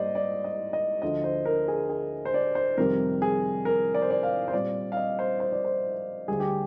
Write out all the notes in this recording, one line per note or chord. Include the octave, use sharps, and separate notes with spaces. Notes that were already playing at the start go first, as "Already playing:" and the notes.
Already playing: G#2 G3 A#3 C5 D5 D#5
D5
D#5
D#5
D2 D3 F3 D#5
C5
A#4
G#4
G#4
C5
D5
C5
F2 C3 D#3 G3 A#4
G#4
A#4
D5
C5
D5
F5
C5
A#2 G3 C4 D5
F5
D#5
C5
C5
D5
C5
D2 D3 G3 G#4
G4